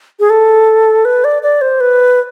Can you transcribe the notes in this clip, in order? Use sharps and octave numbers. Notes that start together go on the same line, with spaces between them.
G#4
A4
B4
D5
D5
C5
B4